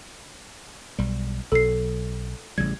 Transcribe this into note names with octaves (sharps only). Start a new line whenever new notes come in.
B1 G3
B1 F#3 A4 C7
A1 C#3 G3 G#6